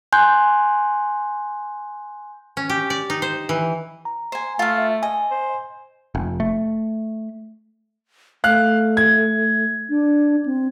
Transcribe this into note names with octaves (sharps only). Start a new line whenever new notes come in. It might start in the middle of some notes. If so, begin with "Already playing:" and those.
G#5 C6 F#6 G6
C#4
G4
D5
D#4
C5
E3
A#5
C5 G#5
A3 F4 F5
E5
D#5 G#5
C5
F1
A3
A3 F5 F#6
G#6
D4
C4